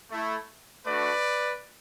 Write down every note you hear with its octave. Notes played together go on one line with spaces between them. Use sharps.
A3 E4
A3 D4 F#4 B4 D5